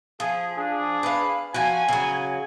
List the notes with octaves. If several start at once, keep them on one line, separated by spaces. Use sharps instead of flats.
F3 G#4
D4 G#4
B4 F5
F3 F#4 G#5
C#3 F#3